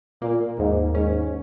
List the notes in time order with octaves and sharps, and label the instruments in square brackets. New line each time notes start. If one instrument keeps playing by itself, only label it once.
[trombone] A#2 [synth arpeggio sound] A#3
[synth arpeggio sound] D#2 [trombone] G#2
[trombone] G#2 [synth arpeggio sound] C#4